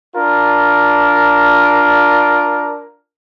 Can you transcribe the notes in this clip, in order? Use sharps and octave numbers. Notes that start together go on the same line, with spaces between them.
D4 F4 A#4